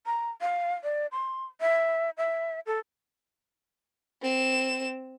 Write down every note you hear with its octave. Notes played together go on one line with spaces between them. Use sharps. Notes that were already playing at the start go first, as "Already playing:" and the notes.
A#5
F5
D5
C6
E5
E5
A4
C4 E7